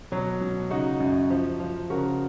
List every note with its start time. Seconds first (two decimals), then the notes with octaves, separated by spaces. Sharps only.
0.12 B2 F#3
0.41 B2
0.70 C#3 D#4 F#4
1.00 F#2
1.30 F3
1.60 F3
1.90 C#3 F#4 A#4